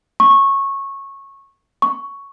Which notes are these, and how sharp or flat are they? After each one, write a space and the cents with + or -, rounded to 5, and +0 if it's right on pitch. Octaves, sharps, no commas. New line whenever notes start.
C#6 -15
C#6 +5